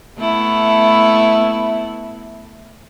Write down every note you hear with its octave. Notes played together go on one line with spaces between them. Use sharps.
A3 B3 E4